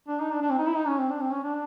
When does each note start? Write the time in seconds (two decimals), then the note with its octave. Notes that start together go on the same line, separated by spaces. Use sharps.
0.08 D4
0.20 D#4
0.31 D4
0.42 D4
0.50 C4
0.58 D#4
0.67 E4
0.76 D#4
0.87 C#4
0.99 C4
1.10 D4
1.21 C4
1.33 C#4
1.43 D4